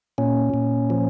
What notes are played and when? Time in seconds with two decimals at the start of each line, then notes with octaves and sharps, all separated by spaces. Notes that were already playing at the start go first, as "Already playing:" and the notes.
0.18 A#2 C#4
0.54 A#2
0.90 F3